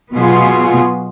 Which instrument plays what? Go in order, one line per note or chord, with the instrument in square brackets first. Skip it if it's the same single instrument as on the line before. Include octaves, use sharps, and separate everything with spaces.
[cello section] B2 F#3 B3 F4 G#4